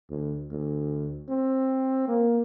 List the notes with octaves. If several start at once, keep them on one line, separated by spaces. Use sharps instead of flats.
D2
D2
C4
A#3